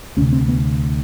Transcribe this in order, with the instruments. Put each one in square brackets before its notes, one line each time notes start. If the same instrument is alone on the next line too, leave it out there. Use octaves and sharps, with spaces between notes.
[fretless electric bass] D2 C#4
C3
C4
B3